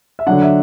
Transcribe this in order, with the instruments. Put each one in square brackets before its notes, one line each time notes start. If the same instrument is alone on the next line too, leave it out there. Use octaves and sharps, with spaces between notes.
[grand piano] E5
D3 F#3 D4 F#5
E5